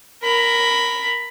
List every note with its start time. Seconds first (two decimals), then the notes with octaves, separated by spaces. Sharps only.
0.23 A#4 B5